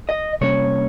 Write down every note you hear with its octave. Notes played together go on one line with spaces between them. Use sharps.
D#5
C3 G3 A#3 C#4 C#5